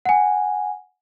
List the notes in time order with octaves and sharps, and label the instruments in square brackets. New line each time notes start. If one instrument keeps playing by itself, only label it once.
[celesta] F#5 G#5